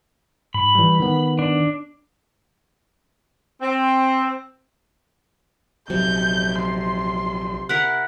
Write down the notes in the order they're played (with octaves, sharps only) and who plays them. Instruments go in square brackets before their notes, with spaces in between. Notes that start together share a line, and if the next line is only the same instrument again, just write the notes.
[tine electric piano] G#2 [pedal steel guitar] B5
[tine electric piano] E3 G3
D#3 B3
[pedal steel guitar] D4
[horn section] C4
[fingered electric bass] A#1 F#3 [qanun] C3 [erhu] G6
[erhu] C6
[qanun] E4 A#4 F#5 [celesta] F#6 B6